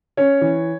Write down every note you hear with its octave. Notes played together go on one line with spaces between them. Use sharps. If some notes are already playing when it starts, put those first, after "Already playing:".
C#4 C#5
E3